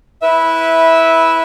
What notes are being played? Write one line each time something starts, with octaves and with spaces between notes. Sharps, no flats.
E4 B4 E5